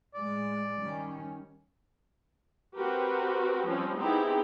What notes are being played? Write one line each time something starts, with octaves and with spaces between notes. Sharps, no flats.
A2 G#3 D5
D#3 G3 C#4
C4 F#4 G4 A#4 B4
F3 G3 C4 C#4
B3 C4 D#4 E4 G4 G#4